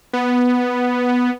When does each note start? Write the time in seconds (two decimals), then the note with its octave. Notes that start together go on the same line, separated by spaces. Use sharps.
0.13 B3